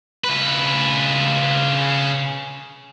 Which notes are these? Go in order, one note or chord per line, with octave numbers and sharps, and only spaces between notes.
C#3 B4